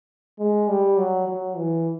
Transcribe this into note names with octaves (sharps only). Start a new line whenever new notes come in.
G#3
G3
F#3
F#3
E3